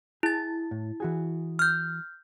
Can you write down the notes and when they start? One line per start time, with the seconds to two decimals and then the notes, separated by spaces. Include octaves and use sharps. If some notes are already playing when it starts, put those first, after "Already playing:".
0.23 E4 G#4 A6
0.71 A2
1.00 E3 F#4 G#4
1.59 F6 G6